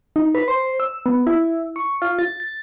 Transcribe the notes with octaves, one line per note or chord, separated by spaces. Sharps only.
D#4
B4
C5
E6
B3
E4
C#6
F4
A6
A6